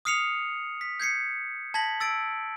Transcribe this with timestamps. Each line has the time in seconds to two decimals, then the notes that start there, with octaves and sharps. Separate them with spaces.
0.05 D#6 F6 C7 C#7 F7
0.81 B6
1.00 G6 G#6 C7 C#7
1.74 A5 G#6 A#6 B6 F#7
2.00 E6 A6 D7